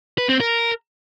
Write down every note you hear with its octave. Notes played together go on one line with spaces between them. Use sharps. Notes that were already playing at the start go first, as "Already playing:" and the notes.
B4
C4
A#4